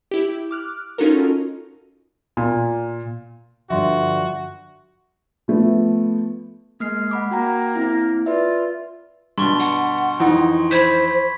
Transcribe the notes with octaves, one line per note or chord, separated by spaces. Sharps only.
E4 G4
D6 F6 F#6
C#4 D#4 F4 F#4 A4 A#4
A#2
G2 D3 F3 F#4 E5 C6
F3 A3 B3
G#3 A#3 F6 C7
F#5 B5 D6
A#3 F#4 G5 A#5
C4 E4
F4 B4 D5 E5
G2 B2 C6 C#6 G7
F#5
F2 E3 D#4
C5 B5 G#6 B6